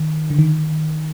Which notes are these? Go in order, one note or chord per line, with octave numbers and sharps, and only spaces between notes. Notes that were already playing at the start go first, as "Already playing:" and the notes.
Already playing: D#3
D3
D#3